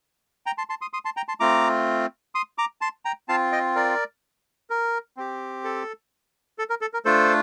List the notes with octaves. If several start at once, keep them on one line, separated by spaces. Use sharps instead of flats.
G5 A#5
A5 C6
A5 C6
C6 D#6
C6 D#6
A5 C6
G5 A#5
A5 C6
A3 C4 F4 A#5 D6
C6 D#6
A#5 D6
A5 C6
G5 A#5
C4 F4 F5 A5
D#5 G5
A#4 D5
A#4
C4 G4
A4
A4
A#4
A4
A#4
A3 D4 F4 A4 C5